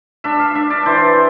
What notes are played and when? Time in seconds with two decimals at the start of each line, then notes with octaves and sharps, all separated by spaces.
0.24 D4 E5
0.39 F5
0.55 D4 E5
0.70 D5
0.86 E3 C5